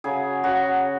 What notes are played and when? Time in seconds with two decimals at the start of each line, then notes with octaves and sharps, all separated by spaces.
0.04 C#3 F#3 G#4
0.43 C#3 F#3 F#4